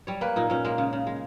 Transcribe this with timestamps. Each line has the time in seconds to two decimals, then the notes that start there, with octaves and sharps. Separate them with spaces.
0.07 G3 C#5
0.21 A#3 B4
0.36 A#2 D#4
0.50 A#2 C#4
0.65 G#3 A#3
0.78 C#3
0.93 C#3
1.07 G#3